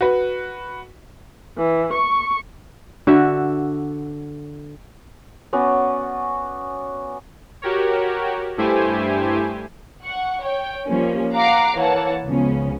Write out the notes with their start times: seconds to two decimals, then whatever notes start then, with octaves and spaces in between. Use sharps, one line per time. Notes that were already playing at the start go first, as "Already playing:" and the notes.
0.01 F#4 B4
1.58 E3
1.93 C#6
3.07 D3 F#4 E5
5.53 B3 C#4 F#4 D5
7.62 F#4 G4 A#4 C#5
8.57 G2 A3 E4 G4 C5 G#5
10.05 F#5 C#6
10.43 C#5 G5
10.87 F3 G3 A#3 C#4
11.34 F5 F#5 A#5 D6 C7
11.78 E3 A#3 C#5 F#5 A5
12.26 C#2 C#3 F3 B3 C#4